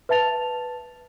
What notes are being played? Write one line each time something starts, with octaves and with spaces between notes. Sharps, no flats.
B4 E5 A5 A6 F7